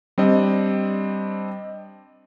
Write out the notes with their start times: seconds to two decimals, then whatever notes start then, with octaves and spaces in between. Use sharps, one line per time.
0.18 G3 C4 D4 D#5